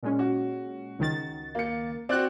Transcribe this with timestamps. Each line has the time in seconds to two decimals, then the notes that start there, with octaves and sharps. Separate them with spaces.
0.03 A#2 G#3 C#4
0.19 F#4
0.99 C#2 D#3 A6
1.55 A#3 C#7
2.09 C4 F#4 D5 F#6